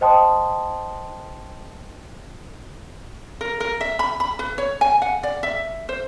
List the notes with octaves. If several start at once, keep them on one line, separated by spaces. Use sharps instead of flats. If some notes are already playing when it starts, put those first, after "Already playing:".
C5 D#5 G5 A5 C6 D#6
A#4
A#4
E5
B5
B5
B4
C#5
G#5
F#5
D5
E5
C5